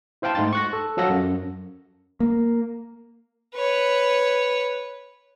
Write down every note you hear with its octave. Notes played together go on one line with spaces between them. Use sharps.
E4 C5 F5 G5 A5
G#2 A3 D#4 C6 A6
C#6 F#6 A#6
A4
F3 F#3 A4 F5 F#5 A#6
F#2
A#3
B4 C#5